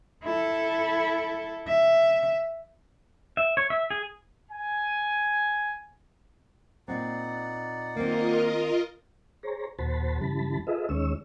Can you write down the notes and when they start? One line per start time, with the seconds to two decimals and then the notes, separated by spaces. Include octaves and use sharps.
0.24 E4 A4
1.68 E5
3.37 E5
3.57 C#5
3.70 E5
3.90 G#4
4.51 G#5
6.88 A#2 C4 D#4 D5 F#5
7.96 D#3 A#3 C4 F4 A#4 D#5
9.43 G#4 C5 C#5 A#5
9.79 D#2 A#2 F#4 C5 A5 B5
10.21 G2 C#3 E3 G3 A5 B5
10.67 F4 G#4 A4 B4 D#5 E5
10.89 D#2 D#3 G#3 C#4 C#5 E6